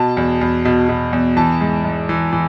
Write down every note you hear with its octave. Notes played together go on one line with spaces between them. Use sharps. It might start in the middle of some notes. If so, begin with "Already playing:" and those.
Already playing: B2 A5
E2
E2
B2
B2
E2
E3 A5
G#2
G#2
E3
E3